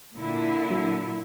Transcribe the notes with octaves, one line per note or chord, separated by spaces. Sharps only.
A#2 D3 E4
F#3